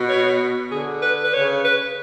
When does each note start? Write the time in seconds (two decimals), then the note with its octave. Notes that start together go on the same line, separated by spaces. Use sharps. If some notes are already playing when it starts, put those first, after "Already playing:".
Already playing: B2
0.09 C#5
0.71 D3 G#4
1.02 B4
1.24 B4
1.34 C#3 C#5
1.65 B4